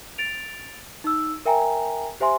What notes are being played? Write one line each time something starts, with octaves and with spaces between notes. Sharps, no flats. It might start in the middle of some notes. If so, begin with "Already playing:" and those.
A6 D7 F7
D#4 E6
A#4 E5 G5 G#5 A#5
G4 C5 E5 G#5 C6